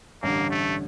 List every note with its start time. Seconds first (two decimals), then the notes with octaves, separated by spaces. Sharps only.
0.22 A1 G2 D3 G3 A#3
0.51 A3